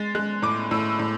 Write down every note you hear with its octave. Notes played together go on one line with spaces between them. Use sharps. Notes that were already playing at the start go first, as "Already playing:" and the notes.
Already playing: G#3 A6
G#3 F#6
A2 D6
A2 E6
A2